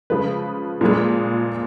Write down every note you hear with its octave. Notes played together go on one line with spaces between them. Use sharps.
C#3 F3 G#3 B4
A#2 F3 G#3